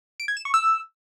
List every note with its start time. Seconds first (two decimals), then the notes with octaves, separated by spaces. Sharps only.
0.20 D7
0.28 G#6
0.37 E7
0.45 C#6
0.54 E6